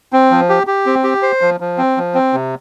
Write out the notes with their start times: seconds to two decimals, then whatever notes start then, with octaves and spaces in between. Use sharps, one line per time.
0.13 C4
0.31 F3
0.49 G4
0.67 G4
0.86 C4
1.04 G4
1.22 C5
1.41 F3
1.60 F3
1.78 C4
1.97 F3
2.14 C4
2.33 C3